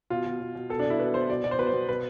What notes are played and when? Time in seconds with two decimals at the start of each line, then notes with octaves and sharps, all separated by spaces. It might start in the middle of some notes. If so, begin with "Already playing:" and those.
0.10 B2 F4
0.26 B2
0.41 B2
0.55 B2
0.70 B2 A4
0.80 D4
0.85 B2 E4
0.99 B2 B4
1.14 B2 C5
1.29 B2 D5
1.44 B2 D5
1.51 C5
1.59 B2 B4
1.67 C5
1.73 B2
1.88 B2 B4